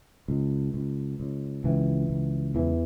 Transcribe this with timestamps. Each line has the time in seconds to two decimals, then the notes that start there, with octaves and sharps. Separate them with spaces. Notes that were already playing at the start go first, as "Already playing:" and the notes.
0.28 C#2
0.74 C#2
1.20 C#2
1.64 C#2 E3
2.10 C#2
2.55 E2 E3